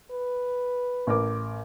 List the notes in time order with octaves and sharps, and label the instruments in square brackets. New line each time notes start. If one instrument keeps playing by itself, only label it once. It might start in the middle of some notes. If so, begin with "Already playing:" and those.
[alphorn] B4
[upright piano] A1 A#4 D6